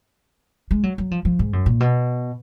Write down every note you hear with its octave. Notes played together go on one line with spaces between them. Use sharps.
G#3
F#3
F#3
F3
F3
G#2
F#2
A#2
B2